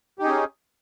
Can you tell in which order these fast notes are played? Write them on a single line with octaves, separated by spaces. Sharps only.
G4 D#4 G#4 C#4